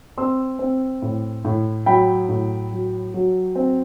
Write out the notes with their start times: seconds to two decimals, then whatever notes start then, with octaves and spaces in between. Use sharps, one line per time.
0.18 C4 C6 E6
0.59 C4
1.02 A2
1.45 A2
1.86 F#3 G5 B5
2.29 A2
2.72 F#3
3.14 F#3
3.56 C4